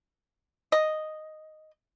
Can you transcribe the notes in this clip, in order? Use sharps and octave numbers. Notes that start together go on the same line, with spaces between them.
D#5